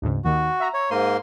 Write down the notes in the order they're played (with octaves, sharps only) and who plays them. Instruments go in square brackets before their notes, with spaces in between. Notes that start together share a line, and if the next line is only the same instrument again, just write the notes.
[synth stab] D2 G#2 C#3
[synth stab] D#2 D#3 [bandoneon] F#4
[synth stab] E5 A#5
[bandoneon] C#5
[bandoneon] G#2 A#3 C6 [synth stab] C5 D#7